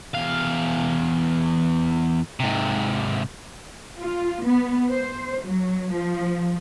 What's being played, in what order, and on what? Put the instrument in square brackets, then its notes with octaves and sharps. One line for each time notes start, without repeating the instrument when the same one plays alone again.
[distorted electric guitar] E2 F5
G#2 C3
[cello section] F4
B3
C5
F#3
F3